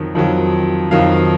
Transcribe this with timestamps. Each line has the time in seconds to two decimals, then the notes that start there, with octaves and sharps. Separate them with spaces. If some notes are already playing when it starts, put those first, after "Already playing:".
Already playing: F2 D#3 F#3
0.15 F2 D#3 F#3
0.91 F2 D#3 F#3 F5